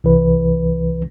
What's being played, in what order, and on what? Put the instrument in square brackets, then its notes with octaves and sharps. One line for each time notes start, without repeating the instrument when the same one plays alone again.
[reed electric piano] C2 E3 B4